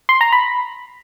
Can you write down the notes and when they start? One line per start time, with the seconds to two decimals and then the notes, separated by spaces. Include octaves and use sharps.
0.09 C6
0.21 A#5
0.32 B5